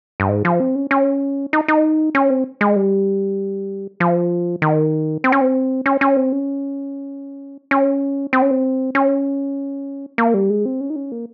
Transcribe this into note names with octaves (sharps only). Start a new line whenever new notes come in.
G2
G#2
F3
C4
C#4
C#4
D#4
D#4
C#4
C4
G#3
G3
F3
D#3
C4
C#4
C4
C#4
C#4
C4
C#4
C#4
C4
C#4
C4
C#4
A#3
G3
G#3
C4
C#4
D#4
C#4
A#3